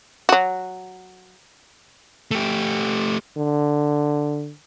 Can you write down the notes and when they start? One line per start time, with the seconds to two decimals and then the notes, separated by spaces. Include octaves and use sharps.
0.29 F#3 F#4
2.31 A3 G4
3.37 D3